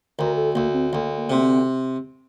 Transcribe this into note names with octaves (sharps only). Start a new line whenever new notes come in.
D2 A#4
A4
D2 A#3
C4
D2 A#3
A#3
C3 A#3
C4